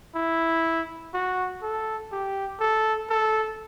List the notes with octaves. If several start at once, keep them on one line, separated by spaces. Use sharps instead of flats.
E4
F#4
A4
G4
A4
A4